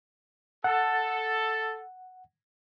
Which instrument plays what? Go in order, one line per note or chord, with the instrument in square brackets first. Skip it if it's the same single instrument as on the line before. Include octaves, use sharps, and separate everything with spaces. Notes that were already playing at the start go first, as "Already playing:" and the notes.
[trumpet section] A4 [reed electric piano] F#5